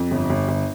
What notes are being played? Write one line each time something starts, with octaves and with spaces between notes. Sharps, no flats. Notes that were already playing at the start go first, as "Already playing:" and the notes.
Already playing: F2
G1
G1
G1